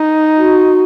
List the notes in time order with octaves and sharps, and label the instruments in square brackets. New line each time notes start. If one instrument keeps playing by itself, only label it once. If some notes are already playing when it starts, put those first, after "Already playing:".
Already playing: [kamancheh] D#4
[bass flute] F#4